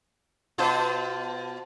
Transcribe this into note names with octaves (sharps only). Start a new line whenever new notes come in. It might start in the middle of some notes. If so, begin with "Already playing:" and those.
B2 F4 C5